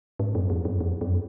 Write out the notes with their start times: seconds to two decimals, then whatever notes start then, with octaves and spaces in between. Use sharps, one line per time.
0.19 G#2
0.35 F#2
0.50 F2
0.65 F#2
0.80 F2
1.01 F#2